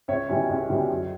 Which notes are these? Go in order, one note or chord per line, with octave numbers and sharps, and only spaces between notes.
C#2 C#5 E5
B2 G3 C#4 E4
C#2
B2 G3 C#4 E4
F#2